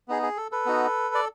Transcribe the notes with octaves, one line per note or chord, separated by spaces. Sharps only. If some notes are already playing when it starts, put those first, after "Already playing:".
B3 D#4 G#4
G#4
A4
A4 B4
B3 D#4 F#4
D5